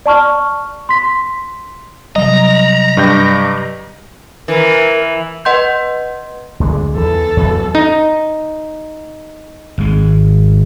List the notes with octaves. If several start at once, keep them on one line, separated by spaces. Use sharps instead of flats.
D5 A5 C#6 F6
C6 B6
C3 F#3 G3 D#5 A#5
G2 G4 G6
E3 A#4
B4 D#5 F#5 C6 G6
D2 D3 G#3
E2 E3 A4
E2 E3 F#3
D#4
G#1 G#3